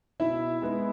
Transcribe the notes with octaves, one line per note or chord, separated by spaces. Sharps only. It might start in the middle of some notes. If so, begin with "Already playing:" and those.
B2 E4 E5
G#3 B3 E4